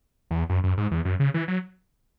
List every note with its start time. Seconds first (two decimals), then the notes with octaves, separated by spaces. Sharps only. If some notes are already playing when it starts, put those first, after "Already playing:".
0.31 E2
0.49 F#2
0.64 F#2
0.77 G#2
0.91 E2
1.05 F#2
1.20 C#3
1.34 E3
1.48 F#3